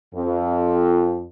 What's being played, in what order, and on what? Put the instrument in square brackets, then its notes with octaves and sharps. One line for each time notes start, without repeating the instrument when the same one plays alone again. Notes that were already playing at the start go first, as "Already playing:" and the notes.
[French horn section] F2